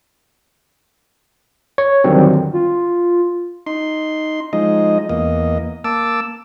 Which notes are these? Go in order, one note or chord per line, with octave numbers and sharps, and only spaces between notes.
C#5
D3 D#3 F#3 G3 C4
F4
D#4 C6
F3 G#3 D#4 D#5
E2 A#3 D#5
A#3 A5 D6 E6